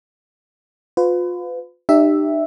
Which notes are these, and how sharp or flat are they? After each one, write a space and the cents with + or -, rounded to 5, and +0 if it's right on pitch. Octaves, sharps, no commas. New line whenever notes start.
F4 +30 B4 +35
D#4 -45 G4 +0 E5 +0